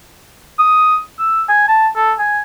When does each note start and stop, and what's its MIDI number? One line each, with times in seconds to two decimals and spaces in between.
0.59 0.97 87
1.19 1.42 88
1.49 1.64 80
1.68 1.88 81
1.96 2.13 69
2.19 2.42 80